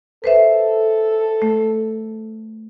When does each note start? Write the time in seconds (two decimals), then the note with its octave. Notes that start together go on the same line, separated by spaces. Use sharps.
0.24 A4 B4 C5 E5
1.42 A3